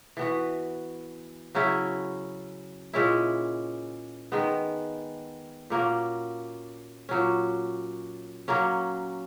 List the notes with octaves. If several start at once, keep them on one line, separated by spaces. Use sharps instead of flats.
E3 B3 F#4
C#3 F#3 C#4 E4
A#2 G#3 C#4 E4
D#3 G#3 B3
A#2 A#3 C#4 F#4
A#2 F#3 C#4
F#3 A#3 C#4